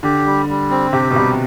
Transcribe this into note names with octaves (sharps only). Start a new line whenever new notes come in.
D3 G4
G3
G3
C4
C3 G4
B2
C3 G3